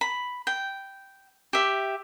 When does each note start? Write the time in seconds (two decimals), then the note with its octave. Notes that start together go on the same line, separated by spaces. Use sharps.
0.01 B5
0.47 G5
1.53 G4 E5